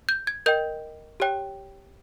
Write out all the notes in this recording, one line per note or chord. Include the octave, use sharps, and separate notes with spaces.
G6
G#6
A#4 D#5 G5 G6
G4 C#5 G5